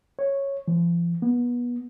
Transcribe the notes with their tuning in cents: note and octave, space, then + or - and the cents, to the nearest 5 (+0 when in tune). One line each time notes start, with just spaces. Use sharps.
C#5 -5
F3 -40
B3 -25